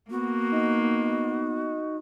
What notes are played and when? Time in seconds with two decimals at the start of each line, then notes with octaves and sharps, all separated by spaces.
0.10 A#3 B3 F#4
0.52 D#4